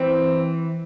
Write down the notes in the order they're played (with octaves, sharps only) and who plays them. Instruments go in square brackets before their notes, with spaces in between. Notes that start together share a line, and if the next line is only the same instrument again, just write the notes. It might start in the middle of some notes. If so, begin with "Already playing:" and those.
Already playing: [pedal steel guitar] E3 [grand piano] C4